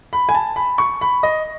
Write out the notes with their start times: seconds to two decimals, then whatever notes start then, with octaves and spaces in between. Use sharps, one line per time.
0.13 B5
0.29 G#5
0.35 A5
0.56 B5
0.78 C#6
1.01 B5
1.23 D#5